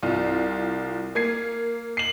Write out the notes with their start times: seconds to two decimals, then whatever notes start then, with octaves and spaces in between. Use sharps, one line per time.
0.03 C2 F4
1.15 A#3 G#6 C7
1.97 C7 F#7